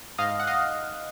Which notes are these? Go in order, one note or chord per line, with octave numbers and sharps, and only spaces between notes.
G#2 D#5 F5
F#5
D#5 F5